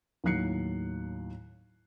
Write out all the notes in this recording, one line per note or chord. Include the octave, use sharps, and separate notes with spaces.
D#2 A2 F#3 F#6 C7 C#7